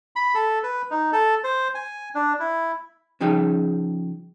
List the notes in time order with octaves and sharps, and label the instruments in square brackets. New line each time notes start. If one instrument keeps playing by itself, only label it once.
[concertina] B5
A4
B4
D#4
A4
C5
G#5
D4
E4
[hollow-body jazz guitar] C#3 F3 D#4 G#4 G5